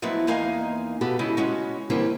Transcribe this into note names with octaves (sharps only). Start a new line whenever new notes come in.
F3 F#3 G#3 A3 B3 E4
E2 G#3 A#3 D#4 F5 G#5
B2 B3 F#4 G4 A4
C#3 G#3 E4 A4 G#5
G#3 C#4 F#4
D3 E3 G3 A#3 C4